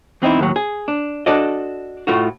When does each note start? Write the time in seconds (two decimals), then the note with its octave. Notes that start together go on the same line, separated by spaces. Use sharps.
0.22 E2 C4 D#4 E4
0.39 D#2 A2 F#3
0.56 G#4
0.88 D4
1.26 D4 F#4 A4 D5 D#5
2.07 A2 A3 F4 F#4